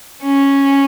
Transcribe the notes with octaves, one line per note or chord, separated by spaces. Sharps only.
C#4